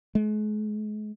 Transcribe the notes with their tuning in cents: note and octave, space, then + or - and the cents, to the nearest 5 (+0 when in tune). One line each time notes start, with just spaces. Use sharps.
G#3 +40